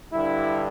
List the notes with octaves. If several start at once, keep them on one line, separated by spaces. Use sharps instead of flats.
G2 D3 G3 E4